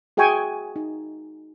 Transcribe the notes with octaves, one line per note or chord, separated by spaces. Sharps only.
F#4 G#4 E5 G5 G#5 C#6
D#4